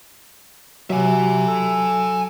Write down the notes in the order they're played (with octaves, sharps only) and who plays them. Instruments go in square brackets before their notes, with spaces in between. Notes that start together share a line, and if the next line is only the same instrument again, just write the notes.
[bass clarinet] C3 [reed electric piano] F#3 [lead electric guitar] E5 G#5
[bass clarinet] A4